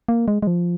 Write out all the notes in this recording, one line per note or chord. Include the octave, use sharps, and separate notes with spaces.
A#3
G#3
G#3
F3